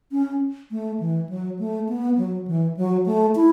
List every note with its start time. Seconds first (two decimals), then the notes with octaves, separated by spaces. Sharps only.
0.12 C#4
0.71 A3
1.00 E3
1.29 F#3
1.59 A3
1.89 B3
2.18 F#3
2.47 E3
2.77 F#3
3.06 A3
3.35 E4